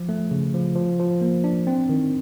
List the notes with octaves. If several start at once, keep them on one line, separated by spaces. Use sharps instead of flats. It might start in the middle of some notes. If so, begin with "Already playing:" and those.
Already playing: F3
A3
C#3
F3
F3
F3
A#3
D4
C4
D#3